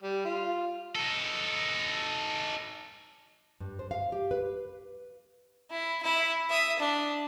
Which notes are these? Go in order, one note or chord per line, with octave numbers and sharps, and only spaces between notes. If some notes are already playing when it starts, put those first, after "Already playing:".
G3
F4
D#4 A4
G2
C5
F5
G4
B4
E4
E4
E5 D#6
D4